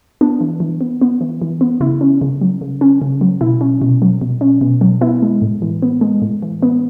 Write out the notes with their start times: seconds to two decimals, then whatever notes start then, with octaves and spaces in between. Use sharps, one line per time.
0.21 B3 D4
0.41 E3
0.60 E3
0.81 B3
1.01 B3
1.21 E3
1.42 E3
1.61 B3
1.80 C#3 E4
2.01 C#4
2.21 C#3
2.41 F#3
2.61 C#3
2.81 C#4
3.02 C#3
3.21 F#3
3.41 B2 E4
3.61 C#4
3.82 B2
4.02 F#3
4.21 B2
4.41 C#4
4.61 B2
4.81 F#3
5.01 B3 E4
5.22 G#3
5.42 A2
5.62 E3
5.82 B3
6.01 G#3
6.22 A2
6.43 E3
6.63 B3